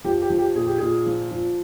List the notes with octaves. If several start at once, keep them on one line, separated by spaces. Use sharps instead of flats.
F3 G4
G4
F3
G4
A#2 G#4
G4
A#2 G#4
F3
F3